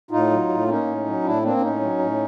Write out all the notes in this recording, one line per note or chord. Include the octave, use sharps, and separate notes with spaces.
A2 D#4 F4
F#3
A2
A#3 C#4 D#4
A2
F#3
A2 D4 E4
A#3 C4 D4
D4
A2 C#4 D#4
F#3
A2